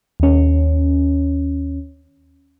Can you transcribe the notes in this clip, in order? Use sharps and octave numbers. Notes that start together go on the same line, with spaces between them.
D#2 C#4